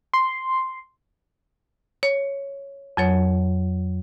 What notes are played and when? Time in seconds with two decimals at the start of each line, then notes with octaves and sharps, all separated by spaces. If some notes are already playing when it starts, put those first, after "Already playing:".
0.14 C6
2.03 C#5
2.97 F2 F#3 C#5